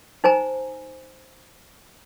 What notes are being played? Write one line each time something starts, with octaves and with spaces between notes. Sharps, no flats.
D#4 C5 G#5 A#5